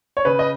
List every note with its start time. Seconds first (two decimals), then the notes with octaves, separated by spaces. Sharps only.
0.17 C#5
0.25 C#3 B4
0.39 D#5